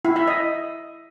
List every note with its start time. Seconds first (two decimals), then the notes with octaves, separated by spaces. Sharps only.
0.05 E4
0.16 E5
0.28 D#5